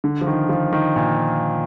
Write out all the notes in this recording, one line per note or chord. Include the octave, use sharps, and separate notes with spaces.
D3
F3
D#3
F3
D#3
A#2